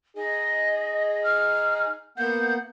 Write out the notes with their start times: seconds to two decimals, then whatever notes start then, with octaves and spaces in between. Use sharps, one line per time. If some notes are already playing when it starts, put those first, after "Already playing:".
0.17 D#4 G#4 D#5
1.24 F6
2.18 A#3 B3 F#5 G6